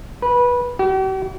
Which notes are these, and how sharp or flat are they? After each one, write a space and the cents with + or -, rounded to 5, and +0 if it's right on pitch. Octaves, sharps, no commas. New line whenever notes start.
B4 -15
G4 -45